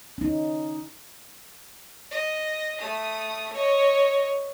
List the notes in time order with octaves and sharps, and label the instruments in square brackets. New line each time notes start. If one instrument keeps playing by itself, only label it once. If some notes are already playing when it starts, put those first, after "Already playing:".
[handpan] C#4 D#4
[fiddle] D#5
A3 D#6
C#5 D#5